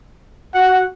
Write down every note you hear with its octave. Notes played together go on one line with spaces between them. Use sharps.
F#4 F#5